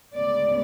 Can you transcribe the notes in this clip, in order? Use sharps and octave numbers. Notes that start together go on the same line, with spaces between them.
D2 C#3 G#3 B3 D5